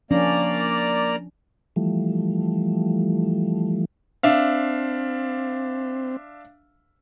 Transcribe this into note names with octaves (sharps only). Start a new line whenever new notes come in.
F3 A#3 C#4 D4 D5 A#5
E3 F3 G3 A3
C4 D4 E5 F5